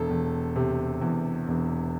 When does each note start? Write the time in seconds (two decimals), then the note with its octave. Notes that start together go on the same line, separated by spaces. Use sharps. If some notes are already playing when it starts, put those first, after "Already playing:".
Already playing: E1 A4
0.10 E1
0.56 C3
1.01 E2
1.48 E1